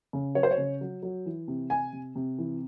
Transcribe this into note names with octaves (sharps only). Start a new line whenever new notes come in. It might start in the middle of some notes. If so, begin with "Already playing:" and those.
C#3
F#3 C#5
C5
C#5
C#3
F#3
F#3
E3
C3
C3 G#5
C3
C3
E3